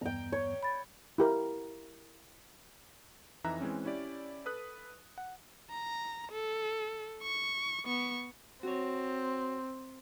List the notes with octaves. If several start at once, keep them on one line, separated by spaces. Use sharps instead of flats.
E2 G2 B3 G5 A#5
C#5
B5 A6
E4 G4 A#4
F2 E3 D#4 E5 A#5 F#6
E3 G#3 C4 C#4
C#4 E4 G4 D5
A4 B4 D#6 F#6
F#5
A#5
A4
C#6
B3 C#6
C4 F#4 C#5